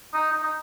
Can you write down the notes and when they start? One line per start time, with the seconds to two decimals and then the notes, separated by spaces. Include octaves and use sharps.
0.14 D#4
0.32 D#4
0.43 D#4